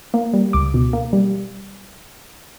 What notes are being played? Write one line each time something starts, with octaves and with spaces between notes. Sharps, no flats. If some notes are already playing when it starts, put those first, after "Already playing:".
A#3
G3
C#2 D6
B2
A#3
G3